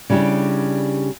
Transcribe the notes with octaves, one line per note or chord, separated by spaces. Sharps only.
C#3 G3 D4 E4 G4